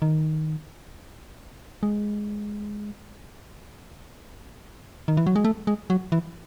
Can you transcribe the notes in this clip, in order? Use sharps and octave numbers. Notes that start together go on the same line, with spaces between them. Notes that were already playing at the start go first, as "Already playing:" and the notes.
D#3
G#3
D#3
E3
F#3
G#3
A3
G#3
F#3
E3